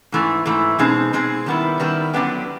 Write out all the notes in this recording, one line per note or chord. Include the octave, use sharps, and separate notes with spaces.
G#2 E3 A3
G#2 E3 A3
B2 G#3 C4 D#4 G#4
B2 G#3 C4 D#4 G#4
D#3 G3 B3 E4
D#3 G3 B3 E4
D3 F#3 B3 D4 G4